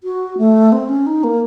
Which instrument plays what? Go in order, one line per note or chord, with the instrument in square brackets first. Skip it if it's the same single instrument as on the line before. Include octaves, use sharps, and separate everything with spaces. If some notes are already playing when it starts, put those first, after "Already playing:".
[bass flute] F#4
A3
C4
C#4
D#4
A#3